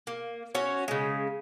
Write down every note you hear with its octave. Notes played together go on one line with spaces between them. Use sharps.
A#3
C#4 F#4 C#5
C#3 G#3